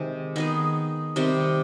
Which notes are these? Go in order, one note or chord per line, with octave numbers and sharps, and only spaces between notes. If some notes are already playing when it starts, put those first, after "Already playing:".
Already playing: C3 D#3 G#3
D#3 B3 D#4 G#4
C3 D#3 G3 C4